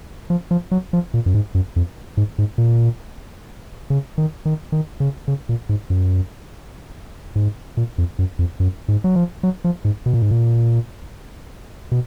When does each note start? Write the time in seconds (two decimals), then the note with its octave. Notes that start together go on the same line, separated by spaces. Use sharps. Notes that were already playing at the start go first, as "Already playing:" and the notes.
0.30 F3
0.51 F3
0.71 F#3
0.93 F3
1.14 A#2
1.26 F#2
1.34 G#2
1.55 F#2
1.76 F2
2.17 G#2
2.38 G#2
2.58 A#2
3.90 C#3
4.18 D#3
4.45 D#3
4.72 D#3
5.00 C#3
5.28 C#3
5.49 A#2
5.69 G#2
5.90 F#2
7.36 G#2
7.77 A#2
7.98 F2
8.19 F#2
8.39 F2
8.60 F#2
8.88 G#2
9.04 F#3
9.15 F3
9.43 F#3
9.64 F3
9.85 G#2
10.06 B2
10.14 A#2
10.22 G#2
10.31 A#2
11.92 B2